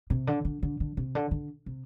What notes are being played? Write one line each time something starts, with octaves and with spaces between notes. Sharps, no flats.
C3
D3
D3
D3
D3
C3
D3
D3
C3